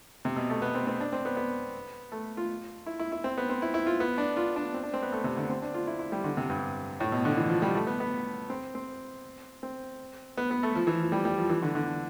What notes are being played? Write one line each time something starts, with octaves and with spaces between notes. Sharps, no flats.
C3
B2
A3
B3
C4
C4
D4
C4
B3
B3
A3
F4
E4
E4
E4
C4
B3
C4
E4
E4
F4
B3
D4
F4
D4
C4
D4
C4
B3
A3
C3
D3
C4
D4
F4
E4
E4
G3
D3
C3
G2
A2
B2
D3
E3
F3
G3
A3
B3
B3
C4
C4
C4
B3
B3
A3
F3
E3
F3
G3
G3
F3
E3
D3
D3